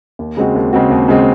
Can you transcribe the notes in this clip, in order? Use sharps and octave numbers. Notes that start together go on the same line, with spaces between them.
D#2
C#3 G#3 C4 F#4
D#2
C#3 G#3 C4 F#4
D#2
C#3 G#3 C4 F#4